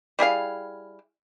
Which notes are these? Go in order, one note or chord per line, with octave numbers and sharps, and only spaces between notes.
G3 E4 G#4 F5